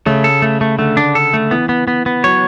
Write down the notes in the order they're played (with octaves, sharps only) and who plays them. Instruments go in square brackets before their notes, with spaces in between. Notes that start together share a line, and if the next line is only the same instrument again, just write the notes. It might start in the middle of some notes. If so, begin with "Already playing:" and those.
[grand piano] C#3 [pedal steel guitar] A3
[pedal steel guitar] A4
A3
A3
[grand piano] D3 [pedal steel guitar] A3
[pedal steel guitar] D4
A4
A3
[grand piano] E3 [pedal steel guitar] B3
[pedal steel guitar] B3
B3
B3
[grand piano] F#3 [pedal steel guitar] C#5